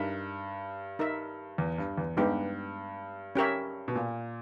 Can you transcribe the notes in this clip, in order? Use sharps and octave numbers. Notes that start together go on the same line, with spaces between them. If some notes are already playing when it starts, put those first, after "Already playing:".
Already playing: G2 D#4 A#4 E5
D#4 A#4 E5
E2
G2
E2
G2 G#3 B3 D#4 G4
C#4 G4 A#4 C#5 E5
B2
A#2